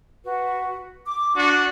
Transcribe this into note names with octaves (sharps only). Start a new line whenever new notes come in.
F#4 B4
D6
D4 F#4